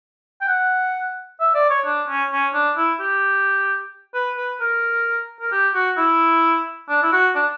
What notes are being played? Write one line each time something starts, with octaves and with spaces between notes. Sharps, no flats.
G5
F#5
E5
D5
C#5
D4
C#4
C#4
D4
E4
G4
B4
B4
A#4
A#4
G4
F#4
E4
D4
E4
F#4
D4